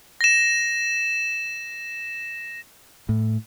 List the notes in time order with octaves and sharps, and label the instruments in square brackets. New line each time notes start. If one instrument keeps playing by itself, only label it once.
[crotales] A#6 E7
[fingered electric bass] A2